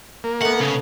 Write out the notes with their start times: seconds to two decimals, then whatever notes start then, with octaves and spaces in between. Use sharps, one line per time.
0.24 A#3
0.41 A3 B3 F#5
0.60 C#3